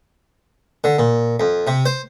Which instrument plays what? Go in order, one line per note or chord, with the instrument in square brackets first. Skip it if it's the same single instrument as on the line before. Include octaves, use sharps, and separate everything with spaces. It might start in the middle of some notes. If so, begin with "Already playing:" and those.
[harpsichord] D3
A#2
F2
C3
C5